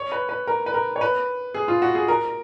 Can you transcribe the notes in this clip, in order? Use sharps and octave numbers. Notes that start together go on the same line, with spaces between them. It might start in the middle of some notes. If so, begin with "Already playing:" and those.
Already playing: C#5
B4
B4
A#4
B4
A#4
C#5
B4
G#4
F4
F#4
G#4
A#4